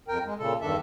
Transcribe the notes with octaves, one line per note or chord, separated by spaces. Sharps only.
F2 A#4 G5
G#3
A#2 C#3 A4
E2 G2 D#3 D4 A4 E5